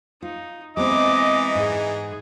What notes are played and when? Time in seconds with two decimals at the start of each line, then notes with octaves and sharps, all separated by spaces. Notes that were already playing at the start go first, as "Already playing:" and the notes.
0.22 D#4 F4
0.77 E3 G#3 B3 C4 D#4 D#5 D6
1.55 G#2 G#4